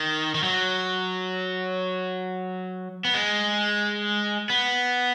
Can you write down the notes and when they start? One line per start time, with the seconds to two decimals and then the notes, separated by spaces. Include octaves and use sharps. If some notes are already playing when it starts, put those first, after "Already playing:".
Already playing: D#3
0.35 D#3
0.44 F#3
3.05 B3
3.14 G#3
4.50 B3